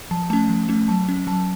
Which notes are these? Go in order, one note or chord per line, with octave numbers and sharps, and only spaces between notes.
F3 A5
A3 C#4 A5
F3
A3 C#4
F#3 A5
C#4
F#3 A5